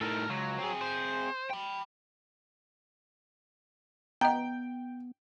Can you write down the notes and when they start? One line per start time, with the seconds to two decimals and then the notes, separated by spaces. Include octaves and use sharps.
0.01 A2 D#3 A4 A#4
0.30 C#2 F#3
0.59 C4 G#4
0.81 C5
1.50 G5 B5
4.21 B3 D#5 G5 A#5